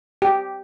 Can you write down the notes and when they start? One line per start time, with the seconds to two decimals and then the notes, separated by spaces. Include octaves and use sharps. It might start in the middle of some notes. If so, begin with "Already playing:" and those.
0.22 G4